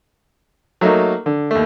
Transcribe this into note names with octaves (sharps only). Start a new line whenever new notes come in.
F#3 A3 A#3 D#4
D3
D#2 A3